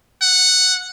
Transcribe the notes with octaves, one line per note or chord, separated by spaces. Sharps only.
F#5